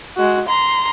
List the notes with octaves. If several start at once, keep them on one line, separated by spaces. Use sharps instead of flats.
G#3 F#4
A#5 C6